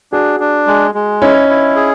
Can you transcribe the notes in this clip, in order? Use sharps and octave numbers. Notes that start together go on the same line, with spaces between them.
D4 F#4 G#4
D4
G#3
G#3
C#4 D#4 E4
E4
G#4